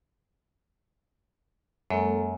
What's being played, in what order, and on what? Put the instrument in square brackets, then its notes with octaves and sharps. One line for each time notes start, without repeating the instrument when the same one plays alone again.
[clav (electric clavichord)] F#2 [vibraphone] G#3 A#3 A4